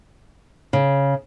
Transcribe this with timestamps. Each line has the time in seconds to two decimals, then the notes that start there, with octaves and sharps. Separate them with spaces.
0.73 C#3